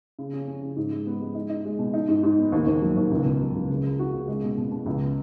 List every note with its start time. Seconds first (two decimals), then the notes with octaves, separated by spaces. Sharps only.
0.19 C#3
0.33 C#4
0.48 C#4
0.63 C#3
0.77 G#2
0.91 G#3
1.07 B3
1.21 G#3
1.35 D#4
1.50 D#4
1.65 G#3
1.79 B2
1.94 D#4
2.08 G#2
2.23 G#2
2.38 B3
2.52 D#2
2.67 D#2
2.82 F#3
2.97 D#2
3.11 C#2
3.25 B2
3.40 F#3
3.54 C#2
3.69 C#3
3.84 C#3
3.99 F#4
4.13 C#3
4.28 G#3
4.43 B2
4.57 B2
4.71 B2
4.86 C#2